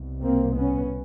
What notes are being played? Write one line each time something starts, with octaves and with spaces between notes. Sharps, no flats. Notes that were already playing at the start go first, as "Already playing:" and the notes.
Already playing: C2 B2
A#3 C4
B3 C#4